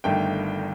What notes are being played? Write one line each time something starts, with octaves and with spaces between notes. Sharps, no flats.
G1 G2 D#3 A3 G5